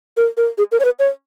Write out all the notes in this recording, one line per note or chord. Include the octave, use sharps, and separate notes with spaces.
A#4
A#4
G#4
A#4
C#5
B4
C#5